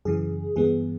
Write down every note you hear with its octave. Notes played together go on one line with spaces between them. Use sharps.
F#2 C#3 E3 G#4
G2 E3 G#3 B3 G#4